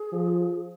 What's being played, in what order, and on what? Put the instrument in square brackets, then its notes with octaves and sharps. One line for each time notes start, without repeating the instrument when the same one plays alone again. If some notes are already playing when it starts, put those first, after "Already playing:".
Already playing: [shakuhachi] G#4
[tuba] F3